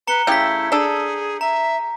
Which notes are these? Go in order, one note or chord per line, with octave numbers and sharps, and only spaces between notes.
B4 A#5 C#7 G7
C#3 A3 E4 G4 G6 B6
D4 G#4 A4
E5 A#5